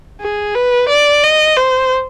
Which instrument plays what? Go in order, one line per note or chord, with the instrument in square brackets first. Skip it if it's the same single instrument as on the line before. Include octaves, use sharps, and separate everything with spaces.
[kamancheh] G#4
B4
D5
D#5
C5